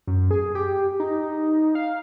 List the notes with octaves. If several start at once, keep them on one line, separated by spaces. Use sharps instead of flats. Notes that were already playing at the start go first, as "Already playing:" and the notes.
F#2
G#4
G4
D#4
F5